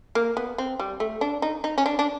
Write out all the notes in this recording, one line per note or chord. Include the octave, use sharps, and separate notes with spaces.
A#3
B3
C4
G3
A3
D4
D#4
D#4
C#4
D4
D4